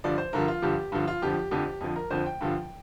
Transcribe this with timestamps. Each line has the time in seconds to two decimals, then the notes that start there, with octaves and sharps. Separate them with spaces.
0.04 G2 D3 F3 D5
0.18 C5
0.33 G2 D3 F3 A#4
0.48 F4
0.62 G2 D3 F3 G4
0.92 G2 D3 F3
1.07 F4
1.22 F2 D3 F3 G4
1.51 F2 D3 F3 G4
1.81 F2 D3 F3
1.96 A#4
2.10 F2 D3 F3 C5
2.26 G5
2.41 G2 D3 F3